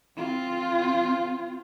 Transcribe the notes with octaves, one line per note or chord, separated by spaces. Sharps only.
C4 F4